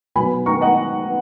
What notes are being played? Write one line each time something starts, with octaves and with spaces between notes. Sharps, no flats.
B2 F#3 B3 G#5 B5
A#5 C#6
D#5 F#5